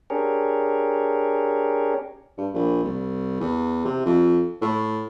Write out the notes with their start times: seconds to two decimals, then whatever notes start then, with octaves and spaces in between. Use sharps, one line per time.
0.10 C#4 D4 G4 G#4 A#4 C#5
2.38 G2
2.54 A#1
2.84 C2
3.40 E2
3.85 C3
4.06 F2
4.62 A2